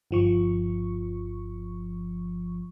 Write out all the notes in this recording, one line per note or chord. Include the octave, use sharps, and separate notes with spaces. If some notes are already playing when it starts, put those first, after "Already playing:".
G1 F3 C#6